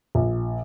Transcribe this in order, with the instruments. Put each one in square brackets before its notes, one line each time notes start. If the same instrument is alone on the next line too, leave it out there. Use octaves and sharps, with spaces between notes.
[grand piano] A#1